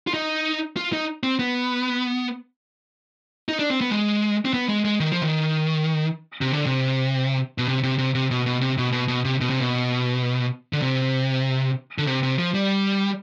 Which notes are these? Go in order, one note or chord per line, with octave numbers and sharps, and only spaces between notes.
F4
D#4
F4
D#4
C4
B3
D#4
D4
C4
B3
G#3
C4
B3
G#3
G#3
D#3
F3
D#3
C3
D3
C3
B2
C3
C3
C3
C3
B2
B2
C3
B2
B2
B2
C3
B2
C3
B2
D3
C3
D3
C3
C3
F3
G3